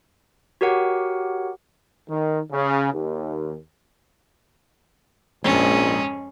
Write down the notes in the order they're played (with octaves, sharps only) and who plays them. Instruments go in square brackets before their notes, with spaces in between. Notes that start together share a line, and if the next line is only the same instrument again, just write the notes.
[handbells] F#4 G4 A#4 C#5 F#5
[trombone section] D#3
C#3
D#2
[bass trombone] A#1 [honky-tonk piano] F2 G#2 [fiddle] C#4